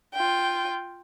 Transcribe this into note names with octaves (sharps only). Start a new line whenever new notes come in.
F4 G5